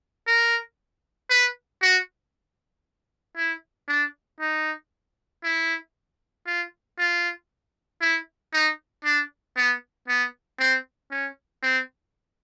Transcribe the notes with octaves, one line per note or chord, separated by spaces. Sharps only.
A#4
B4
F#4
E4
D4
D#4
E4
F4
F4
E4
D#4
D4
B3
B3
C4
C#4
C4